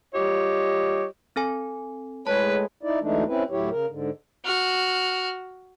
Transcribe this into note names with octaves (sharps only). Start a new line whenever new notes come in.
G3 F4 G4 C#5 D#5
C4 A4 G#5
A2 G#3 B4 C#5 A5
D#4 E4 D5
D2 E3 G#3 A3 D4 D#4
C4 C#4 E4 B4
D2 A2 F#3 E4 G4 C#5
C#3 A#4
G#2 D3
F#4 F6